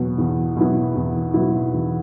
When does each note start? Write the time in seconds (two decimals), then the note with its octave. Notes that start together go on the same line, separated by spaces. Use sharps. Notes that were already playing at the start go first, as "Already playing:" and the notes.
Already playing: E2 B2 F#3 B3
0.18 E2
0.56 B2 F#3 B3 E4
0.96 E2
1.34 B2 F#3 B3 E4
1.73 E2